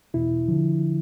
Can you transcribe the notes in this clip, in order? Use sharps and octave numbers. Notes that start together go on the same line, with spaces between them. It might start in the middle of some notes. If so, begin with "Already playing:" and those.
E2 B2 E4
D3 F3